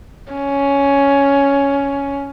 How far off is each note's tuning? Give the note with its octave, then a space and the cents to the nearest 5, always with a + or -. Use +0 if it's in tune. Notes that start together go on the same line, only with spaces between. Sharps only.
C#4 +10